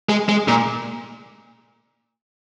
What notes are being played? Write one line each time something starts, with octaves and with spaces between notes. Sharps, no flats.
G#3
G#3
A#2